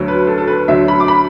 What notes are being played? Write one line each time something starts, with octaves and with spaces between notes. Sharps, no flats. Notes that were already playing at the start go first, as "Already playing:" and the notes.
Already playing: D2 D3 F#3
B4
A4
A4
B4
D2 D3 F#3 E5
B5
D6
B5